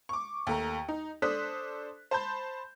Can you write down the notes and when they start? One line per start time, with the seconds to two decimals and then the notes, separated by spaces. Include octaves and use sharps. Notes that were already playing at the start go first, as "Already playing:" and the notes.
0.09 C#6 D6
0.47 D#2 A3 A#5
0.88 D#4
1.22 D4 A4 C5 D#6 F#6 B6
2.11 C5 A5 B5 G6